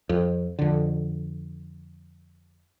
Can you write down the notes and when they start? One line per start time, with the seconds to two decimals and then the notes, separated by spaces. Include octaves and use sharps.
0.09 F2
0.59 F2 D3